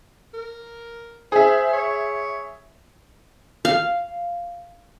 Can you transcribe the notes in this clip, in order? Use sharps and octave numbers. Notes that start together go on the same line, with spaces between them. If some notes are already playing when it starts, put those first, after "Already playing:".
A#4
G#4 C5 E5
C#5
F5